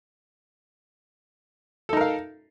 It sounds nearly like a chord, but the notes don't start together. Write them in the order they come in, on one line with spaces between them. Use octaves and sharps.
A4 D#4 A#4 F5